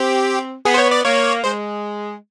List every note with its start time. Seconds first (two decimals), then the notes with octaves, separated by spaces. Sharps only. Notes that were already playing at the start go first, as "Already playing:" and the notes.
Already playing: C4 G4
0.65 B3 G#4
0.74 C5
0.78 C#5
0.91 D5
1.05 A#3 C#5
1.44 G#3 C5